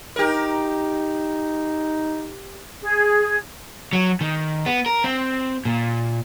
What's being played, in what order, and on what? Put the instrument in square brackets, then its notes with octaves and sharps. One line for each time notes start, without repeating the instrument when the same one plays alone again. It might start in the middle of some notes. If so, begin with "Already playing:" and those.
[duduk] D#4 [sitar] G4 A#4
[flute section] G#4
[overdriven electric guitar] F#3
D#3
B3
A#4
C4
A#2